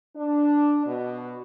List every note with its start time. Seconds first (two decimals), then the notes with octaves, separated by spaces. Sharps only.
0.15 D4
0.87 B2